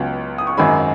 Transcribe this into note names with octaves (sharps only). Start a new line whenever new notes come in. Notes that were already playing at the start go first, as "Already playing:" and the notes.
Already playing: C#2 C#3 F#3 B3 F4
D#6
C#6
G#1 F#2 D#3 G#3 G#5 B5